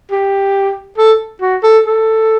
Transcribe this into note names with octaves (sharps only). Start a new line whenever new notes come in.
G4
A4
F#4
A4
A4